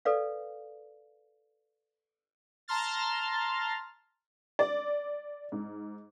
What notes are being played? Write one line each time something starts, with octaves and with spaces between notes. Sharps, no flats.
A4 B4 D5 F5
A5 A#5 C6 F6 A6
D5
G#2